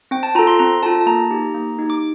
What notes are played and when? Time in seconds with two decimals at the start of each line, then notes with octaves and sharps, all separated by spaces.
0.11 C4 G5
0.23 A5
0.35 F4 A4 A#5
0.47 C6
0.59 C4 A#5
0.83 F4 A4 A5
1.01 A5
1.06 A#3 A#5
1.31 D#4 G4
1.54 A#3
1.79 D#4 G4
1.90 D6